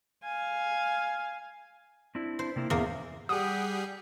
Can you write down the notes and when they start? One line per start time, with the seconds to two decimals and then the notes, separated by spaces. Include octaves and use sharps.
0.24 F5 G#5
2.15 C4 D4 E4
2.39 C5
2.56 C3 A#3 E4
2.70 E2 G#2 B2 A#3 C#4
3.29 G3 G4 G#4 F#5 D#6